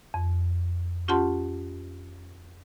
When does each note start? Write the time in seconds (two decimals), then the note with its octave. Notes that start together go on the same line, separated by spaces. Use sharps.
0.14 F2
1.08 C#4 F4 G4 F#5 A5 C6